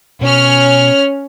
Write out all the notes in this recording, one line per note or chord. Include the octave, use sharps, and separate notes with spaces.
B2 C#4 F6